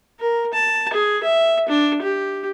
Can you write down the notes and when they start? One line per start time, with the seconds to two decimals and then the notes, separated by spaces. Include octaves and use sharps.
0.20 A#4
0.53 A5
0.93 G#4
1.23 E5
1.68 D4
2.02 G4